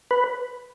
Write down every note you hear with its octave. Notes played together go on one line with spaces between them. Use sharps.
B4